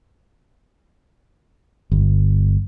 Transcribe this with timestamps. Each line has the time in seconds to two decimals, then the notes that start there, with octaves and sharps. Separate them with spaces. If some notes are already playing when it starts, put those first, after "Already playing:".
1.92 G1